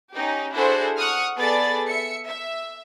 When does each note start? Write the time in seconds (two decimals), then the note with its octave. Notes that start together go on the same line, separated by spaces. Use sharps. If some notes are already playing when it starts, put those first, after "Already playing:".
0.12 C#4 D#4 G4
0.54 D4 E4 F#4 G#4 A4 C5
0.96 F#5 C#6 D#6 F6
1.37 B3 G#4 A4 D5 B5 A6
1.88 E5 C#7
2.26 E5